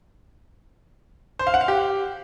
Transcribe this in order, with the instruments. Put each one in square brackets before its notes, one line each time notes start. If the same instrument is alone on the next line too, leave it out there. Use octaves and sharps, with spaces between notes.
[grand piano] C5
F5
F#5
F5
G4